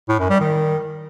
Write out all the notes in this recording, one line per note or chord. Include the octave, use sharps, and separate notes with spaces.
A2
F#2
G3
D#3